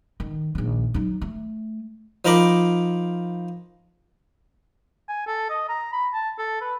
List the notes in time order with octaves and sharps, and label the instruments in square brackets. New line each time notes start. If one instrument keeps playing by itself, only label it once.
[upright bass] D#3
A#1 D#3
F#3 D#4
A3
[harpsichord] F3 D#4 A#4 B5 D6
[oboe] G#5
A4
D#5
A#5
B5
A5
A4
B4